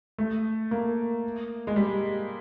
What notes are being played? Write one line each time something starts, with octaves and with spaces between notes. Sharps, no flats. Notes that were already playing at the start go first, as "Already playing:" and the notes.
A3
A#3
G#3
G3